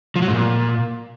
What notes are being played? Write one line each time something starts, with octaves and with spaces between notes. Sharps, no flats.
F3
F#3
G#2
A#2